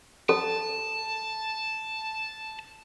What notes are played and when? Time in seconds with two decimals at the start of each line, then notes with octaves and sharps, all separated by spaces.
0.29 A4 A5